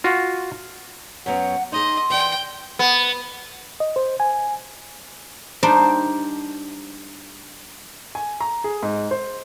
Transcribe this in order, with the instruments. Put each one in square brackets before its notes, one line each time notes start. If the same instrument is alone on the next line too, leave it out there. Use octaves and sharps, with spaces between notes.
[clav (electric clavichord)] F4 F#4
[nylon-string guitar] F#2 F#3 B3 [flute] F#5
[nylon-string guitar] D#4 G#4 [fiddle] D#5 [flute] C6
[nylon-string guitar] E3 D5 [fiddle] G5
[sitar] B3
[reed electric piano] D#5
C5
G#5
[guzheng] G3 D4 D#4 A#4 C5 D5
[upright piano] G#5
A#5
G#4
G#2
C5